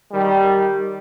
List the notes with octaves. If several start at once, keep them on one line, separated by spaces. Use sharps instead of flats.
D#3 G3